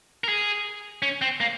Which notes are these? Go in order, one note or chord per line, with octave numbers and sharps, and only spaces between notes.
A#4
G#4
C#4
C4
A#3